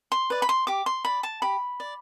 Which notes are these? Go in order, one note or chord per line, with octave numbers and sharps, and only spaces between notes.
C6
B4 D5
B5
C6
G4 D6
C6
D5 B5
A5
G4 B5
D5